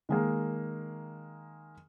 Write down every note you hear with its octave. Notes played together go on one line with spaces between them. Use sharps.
D#3 G#3 A#3